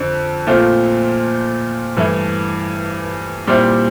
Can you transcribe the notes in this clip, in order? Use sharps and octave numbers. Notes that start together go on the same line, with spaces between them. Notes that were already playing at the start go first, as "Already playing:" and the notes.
Already playing: F2 D3
A#2 A3 C4 F4
G2 E3 A3 E4
A#2 G3 C4 E4